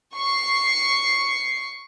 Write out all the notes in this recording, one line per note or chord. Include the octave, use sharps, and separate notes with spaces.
C#6 C7